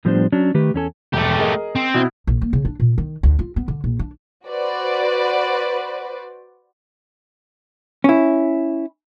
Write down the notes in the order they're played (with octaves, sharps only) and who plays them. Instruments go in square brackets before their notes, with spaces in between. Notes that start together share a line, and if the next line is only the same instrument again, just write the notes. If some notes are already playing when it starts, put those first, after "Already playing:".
[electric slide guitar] A2 F3 G3 B3 D4 C5
F#3 C#4 D4
D#3 A3 G4 B4
E2 C#4 A4 G#5
[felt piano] E1 [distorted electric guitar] A3 G4
[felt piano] G#4 A#4 D#5
[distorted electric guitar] C4
[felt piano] B2 E4
[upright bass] A#1
A#3
C#3
D4
A#2
D#3
D2
F4
B3
D3
A#1
D4
[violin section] F#4 B4 C5 D5
[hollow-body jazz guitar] C#4 E4